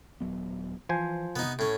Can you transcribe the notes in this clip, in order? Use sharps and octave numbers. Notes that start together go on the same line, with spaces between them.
D#1 F#3 B3
E3 F3 C5 G#5
C3 B3 D#4
A2 C#4